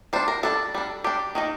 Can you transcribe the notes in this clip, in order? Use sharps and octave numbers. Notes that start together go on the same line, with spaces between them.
G3 D4 C5
A#4
G3 D4 A4
G3 D4
G3 D4 G4
D#3 A#3 D#4